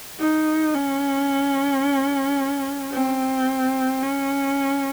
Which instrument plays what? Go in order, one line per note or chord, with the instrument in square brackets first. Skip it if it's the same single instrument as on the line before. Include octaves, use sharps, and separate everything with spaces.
[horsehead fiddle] D#4
C#4
C4
C#4